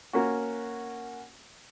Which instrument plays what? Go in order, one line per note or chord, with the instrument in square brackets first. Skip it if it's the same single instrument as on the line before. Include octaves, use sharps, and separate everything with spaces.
[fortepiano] A#3 C#4 F#4